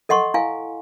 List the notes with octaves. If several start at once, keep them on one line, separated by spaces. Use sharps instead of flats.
A4 D#5 F#5 C6 C#6
E4 F5 G#5